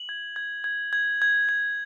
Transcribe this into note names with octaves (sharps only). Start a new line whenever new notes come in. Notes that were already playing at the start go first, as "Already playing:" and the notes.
Already playing: F#7
G#6
G#6
G#6
G#6
G#6
G#6